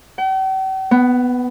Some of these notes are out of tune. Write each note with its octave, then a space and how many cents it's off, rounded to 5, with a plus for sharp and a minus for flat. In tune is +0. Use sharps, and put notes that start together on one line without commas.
G5 -45
B3 +5